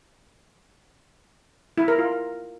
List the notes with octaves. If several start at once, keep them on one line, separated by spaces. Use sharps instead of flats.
E4
A#4
F4